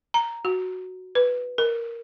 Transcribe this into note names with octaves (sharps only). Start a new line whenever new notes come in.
A#5
F#4
B4
A#4